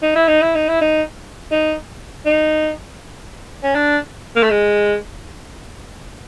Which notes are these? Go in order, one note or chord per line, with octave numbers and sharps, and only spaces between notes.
D#4
E4
D#4
E4
D#4
E4
D#4
D#4
D#4
C#4
D4
A#3
A3
G#3